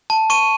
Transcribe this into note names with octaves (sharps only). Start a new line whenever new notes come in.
A5
C#6 D#7